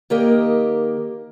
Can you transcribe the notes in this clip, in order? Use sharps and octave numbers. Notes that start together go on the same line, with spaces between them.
D#3 A#3 G4 A#4 D#5